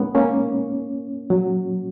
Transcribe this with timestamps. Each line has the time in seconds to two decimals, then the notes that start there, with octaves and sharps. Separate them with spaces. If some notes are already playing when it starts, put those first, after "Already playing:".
Already playing: G#3 A#3 B3 C#4 D#4
0.15 A#3 C#4
1.30 F#3